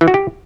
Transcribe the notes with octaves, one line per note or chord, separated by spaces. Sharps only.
E3
F#4
G4